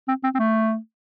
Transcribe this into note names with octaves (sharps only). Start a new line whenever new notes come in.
C4
C4
C4
A3